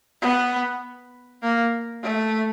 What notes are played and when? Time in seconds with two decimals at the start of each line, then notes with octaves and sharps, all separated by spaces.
0.22 B3
1.42 A#3
2.03 A3